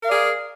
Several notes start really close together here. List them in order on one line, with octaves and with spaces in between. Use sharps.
A#4 F5 D5 G#4